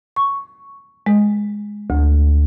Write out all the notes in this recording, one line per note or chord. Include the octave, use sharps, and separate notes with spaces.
C#6
G#3
D2